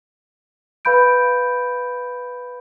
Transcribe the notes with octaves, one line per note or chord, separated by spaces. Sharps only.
B4 F5 B5 G6 D7